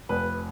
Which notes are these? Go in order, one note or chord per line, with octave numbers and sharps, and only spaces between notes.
F1 B4